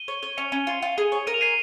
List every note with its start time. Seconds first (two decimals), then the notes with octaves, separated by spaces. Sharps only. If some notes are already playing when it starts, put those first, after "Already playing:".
Already playing: D#7 G7
0.08 C#5
0.23 C#5
0.37 C#4 C#7 F7
0.52 C#4
0.67 F4
0.82 F4
0.98 G#4
1.12 C#5
1.27 A#4 D#7
1.34 F7
1.41 G#5 C7 D#7